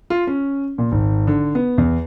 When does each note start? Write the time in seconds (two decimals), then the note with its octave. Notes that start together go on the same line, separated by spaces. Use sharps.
0.10 F4
0.27 C#4
0.78 A#2
0.92 G#1
1.27 D3
1.55 B3
1.78 E2